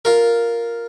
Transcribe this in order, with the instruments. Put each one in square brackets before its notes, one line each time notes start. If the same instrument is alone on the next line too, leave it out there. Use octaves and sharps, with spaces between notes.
[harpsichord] F4 A#4